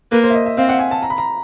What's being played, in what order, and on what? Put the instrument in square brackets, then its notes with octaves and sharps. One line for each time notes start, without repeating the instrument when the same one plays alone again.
[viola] A#3 [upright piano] B4
[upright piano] C5
E5
D#5
E5
[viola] C4 [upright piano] F5
[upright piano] F#5
G#5
A5
A#5
B5
A#5